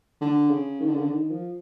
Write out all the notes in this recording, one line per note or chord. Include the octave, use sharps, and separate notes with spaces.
D3
C#3
D#3
D3
C#3
D3
D#3
F3